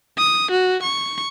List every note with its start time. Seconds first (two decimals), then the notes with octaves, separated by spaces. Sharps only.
0.18 D#6
0.51 F#4
0.83 C#6